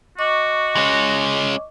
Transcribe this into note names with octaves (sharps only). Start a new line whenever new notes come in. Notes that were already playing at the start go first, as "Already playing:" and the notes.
F#4 D#5 C#6 D6
G#3 C#4